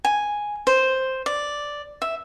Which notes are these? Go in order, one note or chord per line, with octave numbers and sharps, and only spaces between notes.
G#5
C5
D5
E5